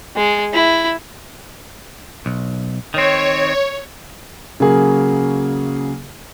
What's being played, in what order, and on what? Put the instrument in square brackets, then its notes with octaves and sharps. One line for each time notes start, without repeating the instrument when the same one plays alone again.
[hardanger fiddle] G#3
E4
[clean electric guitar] B1
[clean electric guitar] D#3 C4 [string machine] C#5
[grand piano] C#3 F#3 A#3 G#4